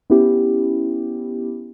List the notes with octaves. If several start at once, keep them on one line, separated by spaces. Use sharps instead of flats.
B3 C#4 E4 G4